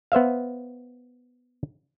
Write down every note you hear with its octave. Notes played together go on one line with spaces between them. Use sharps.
B3 C5 E5 F5